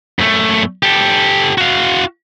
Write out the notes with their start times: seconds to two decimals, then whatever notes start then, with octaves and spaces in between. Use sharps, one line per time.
0.19 F#2 A3
0.83 G4 A4
1.58 F#4 F5